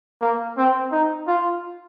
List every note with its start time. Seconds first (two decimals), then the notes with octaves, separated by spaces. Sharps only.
0.21 A#3
0.57 C4
0.91 D#4
1.28 F4